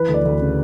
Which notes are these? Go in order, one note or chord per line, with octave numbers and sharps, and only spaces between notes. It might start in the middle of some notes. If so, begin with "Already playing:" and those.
Already playing: E3 B4
D2
D5
D2
C#3